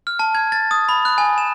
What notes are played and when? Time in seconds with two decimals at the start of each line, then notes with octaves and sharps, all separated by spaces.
0.07 F6
0.19 A5
0.35 G#6
0.52 A6
0.71 D#6
0.89 B5
1.05 F#6
1.18 G#5
1.38 E7